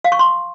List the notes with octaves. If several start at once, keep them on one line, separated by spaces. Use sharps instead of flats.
F5
C#6
C6